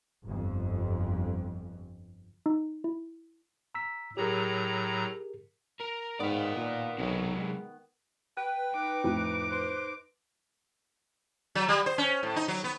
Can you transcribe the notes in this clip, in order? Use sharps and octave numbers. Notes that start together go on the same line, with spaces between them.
G1 F2
D#4
E4
A#5 E6 B6
A2 F#3 G4 G#4 A#4 A#5
A#4
G#2 D#3 B3 D5 F5
A#2
B1 C3 F#3
G#3
B4 G5
D#4 D6
F2 A2
C5
F#3
G3
C5
C#4
A2
D#4
F#3
B3